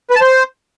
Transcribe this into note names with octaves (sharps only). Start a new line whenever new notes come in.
B4
A5
C5